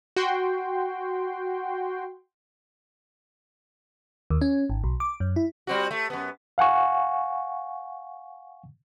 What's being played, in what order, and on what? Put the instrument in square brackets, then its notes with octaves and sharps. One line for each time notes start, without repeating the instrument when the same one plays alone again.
[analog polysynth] F#4 G5 C6
[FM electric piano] D#2
C#4
G#1
B1
D6
F#2
E4
[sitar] G3 C4 F#4
A3
F#2 B3
[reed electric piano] F5 F#5 G#5 C#6